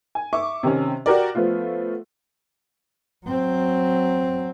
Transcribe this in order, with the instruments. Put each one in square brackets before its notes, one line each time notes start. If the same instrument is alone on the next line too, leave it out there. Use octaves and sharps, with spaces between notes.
[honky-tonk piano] G#5
E5 C#6 D6
C3 D#3 C#4
F#4 G4 A#4 D5
F3 A3 B3 F4
[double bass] F#3 C4